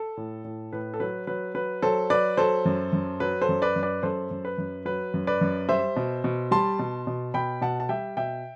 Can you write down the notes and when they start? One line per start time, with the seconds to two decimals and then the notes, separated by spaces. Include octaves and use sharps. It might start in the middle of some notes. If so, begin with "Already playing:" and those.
Already playing: A4
0.17 A2
0.44 A2
0.73 A2 B4
0.94 A4
1.00 F#3 B4
1.27 F#3 B4
1.55 F#3 B4
1.82 F#3 A4 C5
2.10 F#3 B4 D5
2.37 F#3 A4 C5
2.65 F#2
2.93 F#2
3.20 F#3 B4
3.42 A4 C5
3.49 F#2
3.62 B4 D5
3.76 F#2
3.83 B4 D5
4.03 F#2 A4 C5
4.31 F#2
4.45 B4
4.58 F#2
4.85 F#3 B4
5.14 F#2
5.27 B4 D5
5.41 F#2
5.69 G3 C5 E5
5.96 B2
6.24 B2
6.51 G3 A5 C6
6.79 B2
7.07 B2
7.34 B2 G5 B5
7.61 B2 F#5 A5
7.80 A5
7.89 G3 E5 G5
8.17 B2 E5 G5